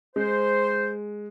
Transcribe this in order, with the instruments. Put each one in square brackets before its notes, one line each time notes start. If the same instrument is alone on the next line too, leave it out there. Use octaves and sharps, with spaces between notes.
[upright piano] G#3 [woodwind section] C5